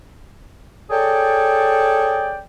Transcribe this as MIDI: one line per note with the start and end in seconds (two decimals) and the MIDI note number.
0.90 2.40 68
0.90 2.40 69
0.90 2.40 73
0.90 2.40 74
0.90 2.40 79